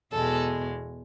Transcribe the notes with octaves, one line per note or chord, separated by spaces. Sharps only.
E2 B2 G#3 A4